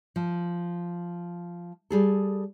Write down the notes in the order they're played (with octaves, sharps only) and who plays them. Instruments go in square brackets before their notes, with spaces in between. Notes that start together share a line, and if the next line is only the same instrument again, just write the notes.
[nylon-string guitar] F3
G3 G#4 A4